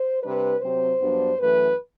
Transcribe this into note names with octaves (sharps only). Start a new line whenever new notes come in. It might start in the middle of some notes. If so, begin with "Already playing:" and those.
Already playing: C5
C3 G3 D4 B4
C3 F#3 C4 C5
G2 F#3 B3 D4
F#2 E3 A3 B4